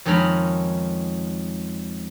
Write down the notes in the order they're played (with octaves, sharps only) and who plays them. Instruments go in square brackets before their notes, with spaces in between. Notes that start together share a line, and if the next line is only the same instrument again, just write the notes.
[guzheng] F2 D#3 G#3 C#4 A#5 B5